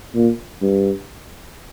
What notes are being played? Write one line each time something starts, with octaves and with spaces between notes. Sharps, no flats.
A#2
G2